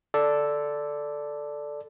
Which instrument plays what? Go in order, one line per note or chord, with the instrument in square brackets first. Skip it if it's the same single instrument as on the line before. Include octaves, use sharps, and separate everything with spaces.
[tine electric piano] A4 D5